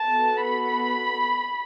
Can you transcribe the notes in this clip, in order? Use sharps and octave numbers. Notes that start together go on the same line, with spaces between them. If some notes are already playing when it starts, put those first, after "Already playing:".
Already playing: A5
B3 F#4 A4
B5